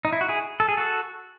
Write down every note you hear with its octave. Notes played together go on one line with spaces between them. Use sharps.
D#4
E4
F#4
E4 G#4
A4
G#4
F#4 A4